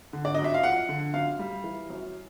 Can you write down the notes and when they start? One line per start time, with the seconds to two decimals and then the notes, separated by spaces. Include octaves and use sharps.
0.13 D3
0.25 D5
0.35 F#2 D#5
0.44 E5
0.54 F5
0.63 F3 F#5
0.89 D3
1.14 F#2 F5
1.39 G3
1.64 E3
1.90 F#2